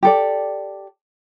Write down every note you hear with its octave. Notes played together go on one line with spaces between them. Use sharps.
G4 A4 D5